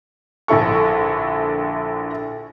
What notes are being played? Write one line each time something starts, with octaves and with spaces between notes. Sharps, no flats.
A#1 D3 E4 A4 C#6